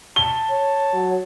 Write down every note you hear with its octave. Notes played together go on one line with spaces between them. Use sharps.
A5 G7
C#5
F#3